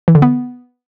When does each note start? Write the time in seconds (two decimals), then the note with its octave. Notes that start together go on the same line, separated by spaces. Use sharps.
0.08 E3
0.15 D3
0.22 B3